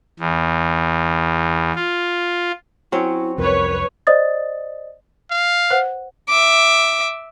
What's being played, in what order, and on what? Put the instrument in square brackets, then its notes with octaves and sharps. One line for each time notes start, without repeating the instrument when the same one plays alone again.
[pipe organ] E2
F4
[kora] F#3 C4 C#4 [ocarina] E4
[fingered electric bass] C2 F2 [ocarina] A#4 [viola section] B4 C#5
[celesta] C5 D5 D#5 D#6 A6
[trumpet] F5
[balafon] B4 C5 F#5
[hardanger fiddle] E5 D6